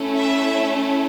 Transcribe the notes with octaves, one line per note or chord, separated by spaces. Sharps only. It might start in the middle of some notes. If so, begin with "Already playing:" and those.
Already playing: A3 C#4 E4 A4
E5